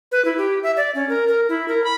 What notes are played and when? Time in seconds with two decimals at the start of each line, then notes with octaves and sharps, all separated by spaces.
0.12 B4
0.25 E4
0.38 G4
0.63 E5
0.77 D5
0.95 C#4
1.09 A#4
1.28 A#4
1.49 E4
1.68 A#4
1.84 B5